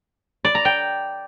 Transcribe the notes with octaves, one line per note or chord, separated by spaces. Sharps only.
D5
A#5
G5